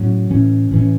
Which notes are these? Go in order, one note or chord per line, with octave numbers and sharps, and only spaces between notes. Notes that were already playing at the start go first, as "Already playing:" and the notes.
Already playing: A2 F#3 C#4
A2 E3 C#4
A2 E3 C#4